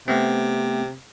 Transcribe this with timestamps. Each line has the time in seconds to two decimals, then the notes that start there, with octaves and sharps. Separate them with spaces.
0.08 C3 A3 B3 C4